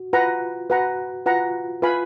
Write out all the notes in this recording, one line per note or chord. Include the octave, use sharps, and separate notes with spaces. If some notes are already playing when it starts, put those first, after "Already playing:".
Already playing: F#4
F4 B4 F#5 A#5
F#4 B4 F#5 A#5
F4 B4 F#5 A#5
F4 B4 F5 G#5 B5